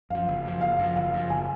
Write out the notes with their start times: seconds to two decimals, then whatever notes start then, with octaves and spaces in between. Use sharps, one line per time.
0.10 F#2 F3 F5
0.28 F#1
0.44 F#2 F3
0.61 F#1 F5
0.79 F#2 F3
0.96 F#1 F5
1.13 F#2 F3
1.29 F#1 G#5